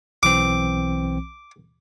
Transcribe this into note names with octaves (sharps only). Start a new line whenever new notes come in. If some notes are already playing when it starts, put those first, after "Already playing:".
B1 E3 C4 D6